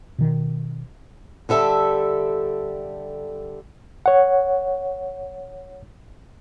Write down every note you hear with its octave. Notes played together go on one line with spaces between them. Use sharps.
B2 D#3
D3 G3 A4 E5
C#5 F#5